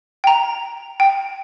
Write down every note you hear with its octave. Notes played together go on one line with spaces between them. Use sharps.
G5 A#5
G5